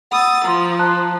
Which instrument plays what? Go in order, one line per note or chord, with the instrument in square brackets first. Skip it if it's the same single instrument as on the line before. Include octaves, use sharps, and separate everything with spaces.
[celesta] F#5 B5 E6 [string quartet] D#6 A6
[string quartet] F3 [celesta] A#5 C6
[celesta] A5 A#5 F#6